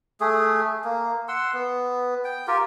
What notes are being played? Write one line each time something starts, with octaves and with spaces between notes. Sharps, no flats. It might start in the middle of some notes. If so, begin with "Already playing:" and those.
A3 G#4
A#3
F#5 C6 E6
B3
G5
F4 G4 A#4